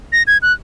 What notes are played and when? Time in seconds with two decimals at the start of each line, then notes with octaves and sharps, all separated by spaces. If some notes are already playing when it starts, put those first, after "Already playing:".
0.12 A#6
0.27 G#6
0.42 F#6